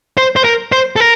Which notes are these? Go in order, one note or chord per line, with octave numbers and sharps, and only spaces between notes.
C5
C5
A#4
C5
A4
A#4